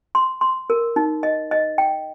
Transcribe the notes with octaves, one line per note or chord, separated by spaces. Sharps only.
C6
C6
A#4
D#4
D#5
D#5
G5